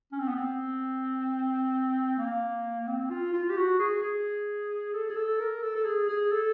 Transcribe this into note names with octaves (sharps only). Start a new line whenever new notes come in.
C#4
C4
B3
C4
A#3
C4
F4
F4
G4
F#4
G#4
G#4
A4
G#4
A4
A#4
A4
A4
G#4
G#4
A4